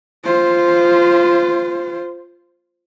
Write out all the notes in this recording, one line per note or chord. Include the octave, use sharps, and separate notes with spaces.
F4 C5